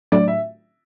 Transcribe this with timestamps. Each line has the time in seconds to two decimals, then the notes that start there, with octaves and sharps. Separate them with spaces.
0.12 A2 F#3 A3 D4 D5
0.28 E5